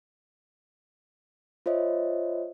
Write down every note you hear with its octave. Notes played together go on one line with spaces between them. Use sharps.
F4 C5 C#5 D#5 E5